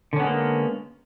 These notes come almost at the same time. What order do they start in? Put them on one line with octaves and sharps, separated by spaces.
D3 C#4 B3 G#3 A#3